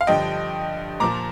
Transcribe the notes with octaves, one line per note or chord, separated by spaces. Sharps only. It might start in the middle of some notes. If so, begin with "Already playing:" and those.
F5
G2 D3 F3 D#5 G5
A#2 F3 A#5 D6